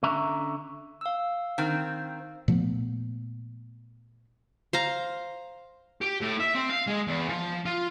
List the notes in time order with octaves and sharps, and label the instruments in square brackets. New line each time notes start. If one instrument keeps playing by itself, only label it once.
[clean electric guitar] D3 C#4 E5 A#5
[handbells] F5 E6
[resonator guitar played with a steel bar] D#3 C4
[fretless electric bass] A#2 F3 A3 B3
[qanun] C5 F5 A#5
[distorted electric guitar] G4
A2
E5
C4
F5
G#3
E2
F3
F4